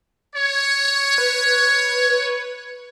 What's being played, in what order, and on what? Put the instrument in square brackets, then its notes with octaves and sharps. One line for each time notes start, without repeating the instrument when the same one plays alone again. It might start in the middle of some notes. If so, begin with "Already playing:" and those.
[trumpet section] C#5
[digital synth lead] B4